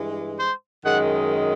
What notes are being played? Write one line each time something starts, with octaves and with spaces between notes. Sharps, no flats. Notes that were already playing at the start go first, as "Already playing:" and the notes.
Already playing: G2 E3 G#3
C5
F#2 D#3 G#3 F#5